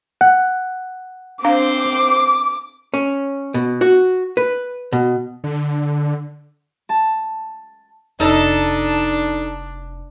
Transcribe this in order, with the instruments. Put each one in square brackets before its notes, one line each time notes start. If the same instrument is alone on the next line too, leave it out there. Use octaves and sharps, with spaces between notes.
[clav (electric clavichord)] F#5
[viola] C4 C5 [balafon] D4 F5 [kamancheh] D6
[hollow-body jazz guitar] C#4
B2
F#4
B4
B2
[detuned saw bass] D3
[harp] A5
[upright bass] F1 [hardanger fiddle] D4 [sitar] D#4 A4